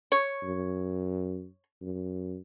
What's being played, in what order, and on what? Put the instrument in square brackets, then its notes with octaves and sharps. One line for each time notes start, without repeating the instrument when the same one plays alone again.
[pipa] C#5
[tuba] F#2
F#2